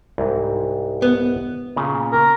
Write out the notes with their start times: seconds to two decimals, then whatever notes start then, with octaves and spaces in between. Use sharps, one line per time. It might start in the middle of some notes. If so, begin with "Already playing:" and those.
0.18 C2 G#2
1.02 B3
1.76 A#2 C#3
2.12 A#4